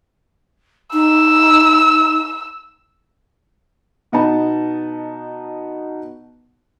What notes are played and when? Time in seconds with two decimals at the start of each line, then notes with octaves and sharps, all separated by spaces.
0.93 D#4 E6
4.12 B2 B3 D#4 A5